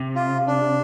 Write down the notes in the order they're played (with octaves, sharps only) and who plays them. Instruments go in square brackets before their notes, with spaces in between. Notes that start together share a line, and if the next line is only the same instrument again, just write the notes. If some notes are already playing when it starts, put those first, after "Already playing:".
Already playing: [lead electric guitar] C3
[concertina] F4
D4